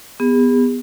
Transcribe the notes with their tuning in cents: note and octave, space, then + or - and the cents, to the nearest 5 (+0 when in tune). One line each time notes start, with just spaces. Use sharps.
B3 +0 G#4 -45